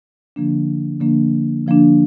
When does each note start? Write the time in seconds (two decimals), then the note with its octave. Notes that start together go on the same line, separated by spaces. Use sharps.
0.36 D3 F3 A#3 D4
1.01 D3 F3 A#3 D4
1.66 D3 F3 A#3 D4